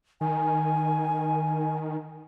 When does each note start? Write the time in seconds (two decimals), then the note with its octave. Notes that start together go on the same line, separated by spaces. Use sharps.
0.21 D#3 G#5